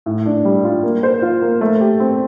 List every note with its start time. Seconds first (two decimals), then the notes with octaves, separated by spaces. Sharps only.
0.06 A2
0.25 D4
0.45 G3
0.64 F4
0.83 A#3
1.03 C5
1.22 F4
1.42 A#3
1.61 A3
1.81 G4
2.00 C4